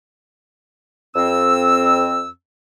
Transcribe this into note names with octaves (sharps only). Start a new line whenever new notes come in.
F2 C4 E6